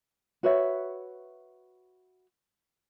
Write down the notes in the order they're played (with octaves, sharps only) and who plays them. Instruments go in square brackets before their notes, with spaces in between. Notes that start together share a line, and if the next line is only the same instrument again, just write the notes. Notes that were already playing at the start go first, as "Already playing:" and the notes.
[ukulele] F#4 B4 C#5 E5